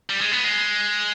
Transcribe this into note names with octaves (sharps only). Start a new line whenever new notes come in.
G3
G#3
B3
G#3